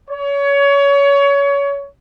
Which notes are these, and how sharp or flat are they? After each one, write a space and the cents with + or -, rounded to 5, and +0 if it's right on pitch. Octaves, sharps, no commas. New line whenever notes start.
C#5 +25